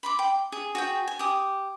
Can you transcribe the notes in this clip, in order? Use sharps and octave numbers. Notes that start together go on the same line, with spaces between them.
B5 C6 D6
G5
G#4
F#4 G#4 G5
G#5
G4 D#6